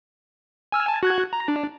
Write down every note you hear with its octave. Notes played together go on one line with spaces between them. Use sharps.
G#5 E6 F6
G#5 A5
F#4 F#6 G#6
A#5
D4